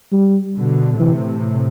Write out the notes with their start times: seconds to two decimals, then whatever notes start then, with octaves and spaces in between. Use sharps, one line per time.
0.12 G3
0.55 B2 D3
0.99 A2 C3 E3